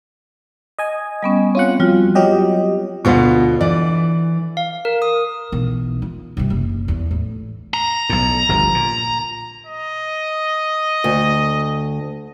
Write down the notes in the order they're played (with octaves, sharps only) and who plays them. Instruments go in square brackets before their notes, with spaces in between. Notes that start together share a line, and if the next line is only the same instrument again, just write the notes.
[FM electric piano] D#5 G#5
[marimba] G3 B3 C#4
[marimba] C4 [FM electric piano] C#4 F4 F#5
[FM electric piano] F2 [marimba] G3 F4 F#4
[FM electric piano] F#3 G4 D#5
[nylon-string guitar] D2 F4 C5 [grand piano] B2 B3
[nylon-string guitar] E3 [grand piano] D5
[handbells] F5
A#4
D#6
[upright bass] B1 E3
F4
G2 C3
F#1
E2
A1
[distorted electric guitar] A#5
[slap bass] B1 A2
G1 D2 F3
A#2
[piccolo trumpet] D#5
[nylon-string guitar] D2